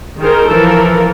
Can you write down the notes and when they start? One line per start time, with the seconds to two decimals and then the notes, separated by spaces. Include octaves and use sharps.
0.20 D#3 D#4 G#4 A#4 C5
0.49 E3 F3 A4 A#4